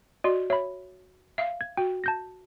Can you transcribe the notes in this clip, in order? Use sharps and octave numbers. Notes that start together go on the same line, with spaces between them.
F#4 D5 D#5 C6
C#5 E5 B5
E5 F5
G#6
F#4 G5
A5 G6 A#6